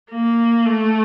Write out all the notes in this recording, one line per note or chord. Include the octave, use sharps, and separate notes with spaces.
A#3
A3